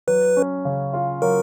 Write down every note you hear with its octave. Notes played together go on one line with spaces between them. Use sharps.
F#3 B4
C#4
C#3
F4
F#3 A#4